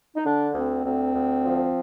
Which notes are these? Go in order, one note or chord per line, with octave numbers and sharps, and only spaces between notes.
D#4
D3 D4
D2 C4
D2 C4
D2
F3